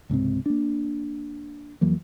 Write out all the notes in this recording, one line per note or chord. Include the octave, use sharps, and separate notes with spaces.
C#2 G#2 C3 C4
A#3 D4
F2 E3 F#3 A#3